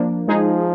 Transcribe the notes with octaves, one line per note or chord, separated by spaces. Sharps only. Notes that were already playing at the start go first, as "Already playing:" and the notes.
Already playing: F3 A#3 D4
F3 G#3 D#4 G#4